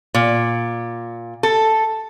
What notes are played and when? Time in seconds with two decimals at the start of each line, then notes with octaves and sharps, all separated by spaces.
0.14 A#2
1.43 A4